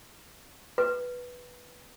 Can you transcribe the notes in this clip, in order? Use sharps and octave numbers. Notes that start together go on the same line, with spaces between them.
B4